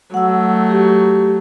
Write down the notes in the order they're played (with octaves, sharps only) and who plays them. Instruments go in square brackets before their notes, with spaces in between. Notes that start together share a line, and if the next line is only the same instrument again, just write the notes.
[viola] F#3 A3 [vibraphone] F#5 E6
[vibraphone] G4